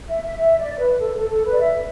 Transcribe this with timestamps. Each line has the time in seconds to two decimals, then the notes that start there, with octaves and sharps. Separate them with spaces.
0.09 E5
0.24 E5
0.38 E5
0.60 D5
0.74 D5
0.79 B4
0.99 A4
1.15 A4
1.30 A4
1.45 B4
1.53 D5
1.60 E5